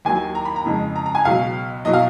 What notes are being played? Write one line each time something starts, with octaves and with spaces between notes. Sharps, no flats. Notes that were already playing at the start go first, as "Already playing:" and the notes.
D#2 D#3 F#3 G#5
A#5
B5
A#5
F2 C#3 G#3
A#5
A#5
G#5
C#2 B2 F#3 F5
B2 F#3 D#5
F5